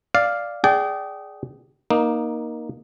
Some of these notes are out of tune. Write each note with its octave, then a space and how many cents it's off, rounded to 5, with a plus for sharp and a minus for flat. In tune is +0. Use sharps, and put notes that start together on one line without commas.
D5 +0 F5 +0
G#4 +0 D5 +0 G5 -30
A#3 +15 D#4 +0